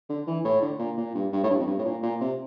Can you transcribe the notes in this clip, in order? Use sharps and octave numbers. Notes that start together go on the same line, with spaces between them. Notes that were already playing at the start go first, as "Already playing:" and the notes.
D3
E3
A2
D3
A#2
A#2
G2
G2
A2
G2
F2
G2
A2
A#2
A#2
C3